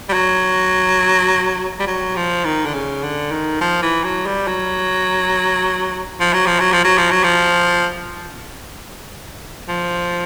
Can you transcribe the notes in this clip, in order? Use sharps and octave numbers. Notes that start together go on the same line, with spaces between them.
G3
F#3
G3
F#3
F3
D#3
D3
C#3
D3
D#3
F3
E3
F#3
G3
F#3
F3
F#3
F3
F#3
F3
F#3
F3
F#3
F3
F3